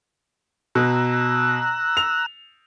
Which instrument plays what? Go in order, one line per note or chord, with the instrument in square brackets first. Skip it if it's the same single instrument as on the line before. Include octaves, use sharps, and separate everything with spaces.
[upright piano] B2 [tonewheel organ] A#5 E6 F#6
[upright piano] F7